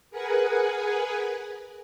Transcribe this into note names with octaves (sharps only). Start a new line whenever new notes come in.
G#4 A#4 B4 F#5 G#5